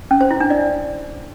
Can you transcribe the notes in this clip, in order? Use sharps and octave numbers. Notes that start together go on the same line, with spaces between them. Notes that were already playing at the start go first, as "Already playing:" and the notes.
C#4
C5
E4
D4
D5